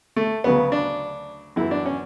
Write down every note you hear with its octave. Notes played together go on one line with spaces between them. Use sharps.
A3
D2 C#3 F#3 B3
D4
F#2 E3 E4
D4
C#4